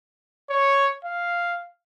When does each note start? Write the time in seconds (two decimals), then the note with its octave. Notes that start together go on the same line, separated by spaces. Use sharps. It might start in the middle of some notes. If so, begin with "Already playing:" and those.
0.50 C#5
1.05 F5